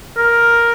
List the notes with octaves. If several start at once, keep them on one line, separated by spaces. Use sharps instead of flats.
A#4